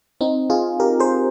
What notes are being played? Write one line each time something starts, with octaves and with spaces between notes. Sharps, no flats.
C4 D#4
F4 G#4
G4 A#4
G#4 C5